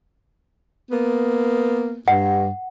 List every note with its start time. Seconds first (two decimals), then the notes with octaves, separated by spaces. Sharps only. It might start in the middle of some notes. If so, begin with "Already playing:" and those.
0.91 A#3 B3
2.08 G2 F#5